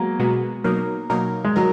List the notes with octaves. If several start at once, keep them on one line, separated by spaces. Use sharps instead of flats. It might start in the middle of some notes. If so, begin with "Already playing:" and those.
Already playing: F#3 G#3 A#3 B3
B2 G#3 B3 F#4
B2 F#3 A#3 D#4 A#4
B2 F#3 A#3 D#4 A#4
G#3
F#3 D#4 A#4